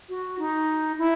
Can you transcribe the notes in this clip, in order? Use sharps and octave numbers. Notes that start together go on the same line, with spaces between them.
F#4
D#4
E4